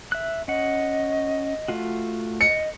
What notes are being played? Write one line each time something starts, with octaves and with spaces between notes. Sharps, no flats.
E5 F#6
C#4 D#5 F#5
A3 F4 F#4
D#5 C#7